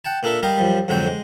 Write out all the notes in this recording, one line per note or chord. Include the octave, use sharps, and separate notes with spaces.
F#5 G5 A5
A#2 D4 A4 A#4 E5
G3 G4 A#4 D#5 F5
F#2 F3 G3
F2 G#2 D3 F#3 C4 G5
G#3